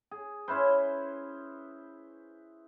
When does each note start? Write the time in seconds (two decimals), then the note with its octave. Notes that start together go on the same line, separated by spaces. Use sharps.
0.11 G#4
0.48 C#4 E4 B4 C5